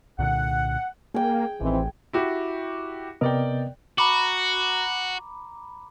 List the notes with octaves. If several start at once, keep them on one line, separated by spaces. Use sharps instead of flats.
C2 A#2 D3 F#5
A#3 G#4 G5
A1 D#3 E3 C4
E4 F#4 G4
C3 B3 A#4 D5 D#5 G5
F#4 A#5 B5 D6